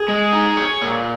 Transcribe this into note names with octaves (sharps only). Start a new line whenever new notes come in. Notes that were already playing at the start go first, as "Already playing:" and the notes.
Already playing: G#4
G#3
D#4
C#5
A#2